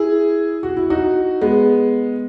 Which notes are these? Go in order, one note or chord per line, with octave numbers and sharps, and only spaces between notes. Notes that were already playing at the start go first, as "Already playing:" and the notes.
Already playing: E4 G#4
F#4
E4
D#4 F#4
G#3 B3